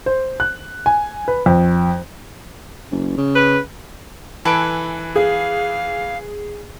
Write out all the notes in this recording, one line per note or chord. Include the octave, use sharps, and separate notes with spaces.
C5
F#6
G#5
B4
F2
F#1
C#3
B4
E3 A4 B4 G#5 D7
G#4 F5